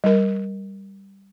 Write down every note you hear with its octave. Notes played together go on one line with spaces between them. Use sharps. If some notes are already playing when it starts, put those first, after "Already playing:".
G3 A#4